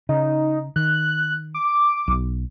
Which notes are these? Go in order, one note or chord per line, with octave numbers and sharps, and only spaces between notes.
C#3 D#4
D#3 F#6
D6
B1